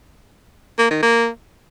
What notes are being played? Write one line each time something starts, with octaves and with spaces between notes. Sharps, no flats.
A#3
D#3
A#3